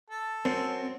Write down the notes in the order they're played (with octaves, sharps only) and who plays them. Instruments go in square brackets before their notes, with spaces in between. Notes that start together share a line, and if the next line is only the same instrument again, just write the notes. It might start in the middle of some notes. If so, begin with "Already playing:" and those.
[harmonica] A4
[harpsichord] F#2 [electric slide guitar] C4